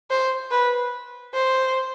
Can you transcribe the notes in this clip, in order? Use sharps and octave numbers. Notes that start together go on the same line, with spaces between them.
C5
B4
C5